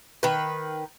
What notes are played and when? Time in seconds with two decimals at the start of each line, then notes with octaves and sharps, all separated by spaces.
0.23 D#3 B4